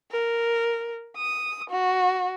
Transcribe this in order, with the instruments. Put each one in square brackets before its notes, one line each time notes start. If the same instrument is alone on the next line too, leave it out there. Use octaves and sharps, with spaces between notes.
[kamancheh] A#4
D#6
F#4